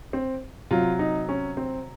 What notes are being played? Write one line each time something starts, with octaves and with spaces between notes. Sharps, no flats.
C4
C3 F#3 F4
D#4
C#4
C4